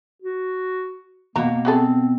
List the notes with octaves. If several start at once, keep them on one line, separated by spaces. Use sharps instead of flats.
F#4
B2 A#3 F#4 A#5
C4 F#4 G#4 A4